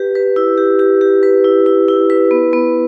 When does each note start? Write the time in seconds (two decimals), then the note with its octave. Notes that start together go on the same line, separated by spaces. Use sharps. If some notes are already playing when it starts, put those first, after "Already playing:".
Already playing: G4 B4
0.15 B4
0.36 E4
0.58 G4
0.79 G4
1.01 G4
1.23 B4
1.44 E4
1.66 E4
1.88 E4
2.10 B4
2.31 B3
2.53 B3